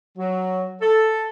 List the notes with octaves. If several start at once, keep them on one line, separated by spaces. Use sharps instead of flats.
F#3
A4